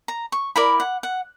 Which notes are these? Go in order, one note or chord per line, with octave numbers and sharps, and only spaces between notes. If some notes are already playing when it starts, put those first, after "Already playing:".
A#5
C#6
E4 A#4 D5 B5
F#5
F#5